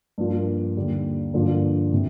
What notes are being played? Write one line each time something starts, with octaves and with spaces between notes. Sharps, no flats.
G2 F3 A#3
D#2 D3 G3
G2 D3 F3 A#3 D4
C3